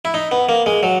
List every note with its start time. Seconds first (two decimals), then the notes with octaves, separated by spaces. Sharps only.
0.05 E4
0.14 D#4
0.32 B3
0.49 A#3
0.66 G#3
0.83 F#3